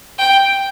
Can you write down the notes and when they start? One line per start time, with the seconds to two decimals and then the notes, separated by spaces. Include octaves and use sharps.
0.18 G5